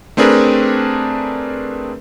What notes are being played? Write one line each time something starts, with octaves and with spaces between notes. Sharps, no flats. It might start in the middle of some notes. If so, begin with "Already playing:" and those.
A3 C4 D4 G#4 A#4 B4